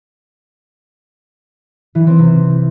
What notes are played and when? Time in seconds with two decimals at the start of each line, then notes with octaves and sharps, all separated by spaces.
1.95 E3
2.07 C4
2.19 C3